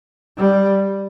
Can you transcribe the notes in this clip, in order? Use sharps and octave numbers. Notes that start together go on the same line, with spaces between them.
G3